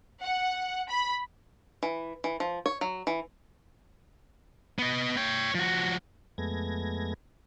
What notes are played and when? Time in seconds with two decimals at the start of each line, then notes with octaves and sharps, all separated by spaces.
0.21 F#5
0.90 B5
1.83 E3
2.24 E3
2.40 F3
2.66 C#5
2.81 F#3
3.07 E3
4.79 B3 D#5
5.17 C#5 G5
5.55 F3 F#4
6.38 F2 G#3 A3 B3 G#6 A#6